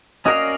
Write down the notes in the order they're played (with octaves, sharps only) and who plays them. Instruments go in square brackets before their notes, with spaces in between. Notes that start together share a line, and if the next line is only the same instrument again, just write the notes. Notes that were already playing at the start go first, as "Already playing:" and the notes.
[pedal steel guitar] C#4 F#4 A#4 D5 F5 [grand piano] D#5 D#6